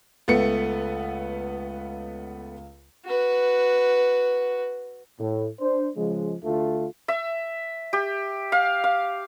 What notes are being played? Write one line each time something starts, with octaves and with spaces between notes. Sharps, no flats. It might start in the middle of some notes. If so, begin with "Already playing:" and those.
C#2 A3 B3 C#7
F#4 B4
A2
D4 C5
C#3 F3 G#3
D2 D3 A3 F4
E5
G4
F5
F5